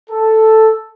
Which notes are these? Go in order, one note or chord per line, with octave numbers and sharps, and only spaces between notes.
A4